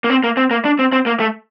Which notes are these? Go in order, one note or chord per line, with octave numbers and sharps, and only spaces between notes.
A#3
C4
A#3
C4
A#3
D4
C4
C4
A#3
A3